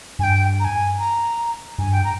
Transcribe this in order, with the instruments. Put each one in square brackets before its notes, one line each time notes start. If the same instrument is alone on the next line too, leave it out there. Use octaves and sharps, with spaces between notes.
[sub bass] G2 [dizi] G#5
[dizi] G5
A#5
G#5
A#5
[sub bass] G2 [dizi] G#5
[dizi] G5
A#5